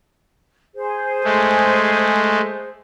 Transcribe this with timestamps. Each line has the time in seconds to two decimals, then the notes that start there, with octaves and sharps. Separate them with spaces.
0.76 G#4 C5
1.24 G#3 A3